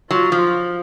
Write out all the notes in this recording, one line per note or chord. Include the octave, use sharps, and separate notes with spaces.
F#3 F4
F3